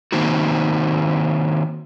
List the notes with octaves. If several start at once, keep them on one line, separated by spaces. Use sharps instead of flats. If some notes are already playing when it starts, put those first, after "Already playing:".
D#3 A#3 C4 D#4 F#4